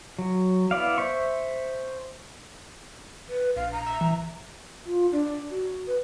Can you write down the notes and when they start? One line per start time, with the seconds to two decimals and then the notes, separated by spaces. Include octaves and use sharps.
0.18 F#3
0.71 B3 E4 D5 F5
0.98 C5 E5 C#6
3.29 B4
3.56 A#1 F5
3.72 A#5
3.87 E5
4.01 E3
4.86 F4
5.12 D4
5.51 F#4
5.87 B4